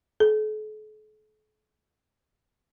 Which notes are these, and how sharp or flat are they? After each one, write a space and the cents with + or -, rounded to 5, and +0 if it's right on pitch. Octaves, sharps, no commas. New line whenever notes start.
A4 -45